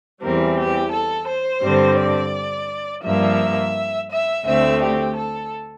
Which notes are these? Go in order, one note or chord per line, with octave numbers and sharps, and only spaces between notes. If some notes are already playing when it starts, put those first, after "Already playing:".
E2 E3 G3 C4 A#4
G4
A4
C5
G2 D3 G3 C4
D5
G2 F3 A#3 E5
E5
D2 D3 A3 C4 E5
G4
A4